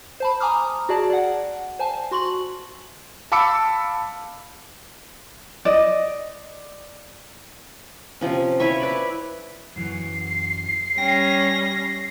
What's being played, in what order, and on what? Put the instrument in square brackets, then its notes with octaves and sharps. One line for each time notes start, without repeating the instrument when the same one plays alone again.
[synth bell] C5 A5 B5
G#5 A#5 D6 D#6 F6
F#4 G#4 D5 A5
D5 F#5
C5 G#5 A5
F#4 C6 C#6 F#7
[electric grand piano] F5 A5 B5 D6 E6 C#7
[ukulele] D5 D#5
[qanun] C3 F3 C#4
E4 B4 C#5 E5
B4 D5 B5
[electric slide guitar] F#2 E3 F#3 [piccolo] C7
[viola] G3 C#4 [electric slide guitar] G5 [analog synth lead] A#6